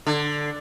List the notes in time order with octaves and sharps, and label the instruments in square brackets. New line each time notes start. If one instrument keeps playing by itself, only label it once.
[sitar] D3